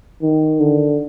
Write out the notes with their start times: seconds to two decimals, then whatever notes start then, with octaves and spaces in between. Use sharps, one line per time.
0.22 D#3
0.60 D3